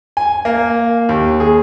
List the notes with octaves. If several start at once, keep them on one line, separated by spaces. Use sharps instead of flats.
G#5
A#3
D#2
G#4